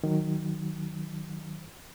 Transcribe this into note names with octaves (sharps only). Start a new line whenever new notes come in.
D#3 F#3